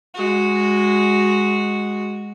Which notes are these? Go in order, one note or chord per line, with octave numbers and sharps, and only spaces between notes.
G#3 F#4